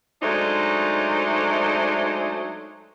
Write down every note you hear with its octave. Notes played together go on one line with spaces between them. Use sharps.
F#3 G#3 A3 D4 D#4 C5